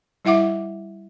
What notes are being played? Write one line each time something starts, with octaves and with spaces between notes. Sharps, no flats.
G3 E4 E5 F#5 D6